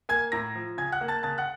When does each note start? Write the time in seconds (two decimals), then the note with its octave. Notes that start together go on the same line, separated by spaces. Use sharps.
0.09 A#3 G#5 G#6
0.32 A2 A#5 A#6
0.55 F3
0.78 C#3 G#5 G#6
0.92 F#5 F#6
1.01 A#3
1.08 A5 A6
1.23 C#3 A5 A6
1.38 F#5 F#6